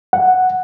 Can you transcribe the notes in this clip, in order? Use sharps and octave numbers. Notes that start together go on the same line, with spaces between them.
F#5